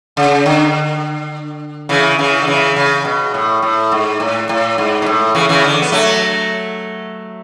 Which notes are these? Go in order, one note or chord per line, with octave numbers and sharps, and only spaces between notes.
C#3
D3
C#3 E3
C#3 E3
D3
C#3 E3
C#3
B2
A2
A2
G#2
A2
A2
G#2
B2
A2
C#3 E3
C#3 E3
D3
B3
F#3 A3